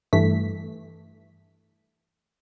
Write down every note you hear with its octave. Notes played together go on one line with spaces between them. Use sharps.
G2 E3 A3 B6